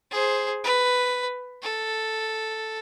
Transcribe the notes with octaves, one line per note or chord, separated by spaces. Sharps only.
G#4 C5
B4
A4